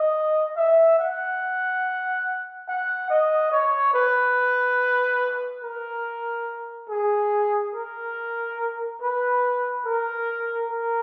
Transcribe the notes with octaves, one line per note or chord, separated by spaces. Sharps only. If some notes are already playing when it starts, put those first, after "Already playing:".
Already playing: D#5
E5
F#5
F#5
D#5
C#5
B4
A#4
G#4
A#4
B4
A#4
A#4